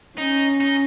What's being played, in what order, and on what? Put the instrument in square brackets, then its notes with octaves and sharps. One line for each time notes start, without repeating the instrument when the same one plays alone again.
[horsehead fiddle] C#4 [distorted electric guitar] D#4
[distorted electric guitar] D#4